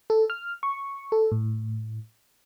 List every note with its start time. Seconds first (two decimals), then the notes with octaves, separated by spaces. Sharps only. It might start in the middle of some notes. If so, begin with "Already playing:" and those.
0.10 A4
0.30 F6
0.63 C#6
1.12 A4
1.32 A2